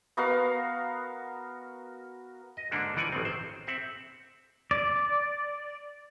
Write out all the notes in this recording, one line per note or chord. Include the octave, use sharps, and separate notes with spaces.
B3 F#4 A#4 F5
D#5
G#2 D3 A#3 D4 F#4
E3 F3 D5 F#5 G#5
A1 D#3 C4
C5
C4 E5 F#5
D5